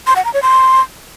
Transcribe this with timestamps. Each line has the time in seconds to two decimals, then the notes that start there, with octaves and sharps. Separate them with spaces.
0.07 C6
0.16 F#5
0.25 A#5
0.34 C#5
0.43 C6